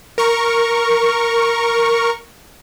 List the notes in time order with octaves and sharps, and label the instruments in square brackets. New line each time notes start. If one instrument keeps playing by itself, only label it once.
[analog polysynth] A#4 C#6